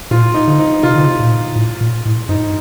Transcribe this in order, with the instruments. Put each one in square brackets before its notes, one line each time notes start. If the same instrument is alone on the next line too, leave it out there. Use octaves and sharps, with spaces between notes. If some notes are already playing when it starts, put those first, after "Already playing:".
[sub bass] A#2 [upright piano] F4
[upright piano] D#4
[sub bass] D3
[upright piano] D#4
[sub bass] C3 [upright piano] F4
[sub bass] D3
C3
A#2
A2
A#2
A2
[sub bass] G2 [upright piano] D#4